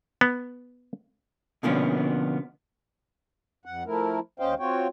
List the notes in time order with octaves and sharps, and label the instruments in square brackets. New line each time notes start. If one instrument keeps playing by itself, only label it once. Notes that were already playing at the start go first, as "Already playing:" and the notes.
[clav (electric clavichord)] B3
[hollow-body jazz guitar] B2 D3 F3 A#3 B3 C#4
[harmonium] F2 F#5
F3 A3 E4 A#4
D#2 C#4 C5 D#5 F5 G5
C4 F4 F#4 C#5 G5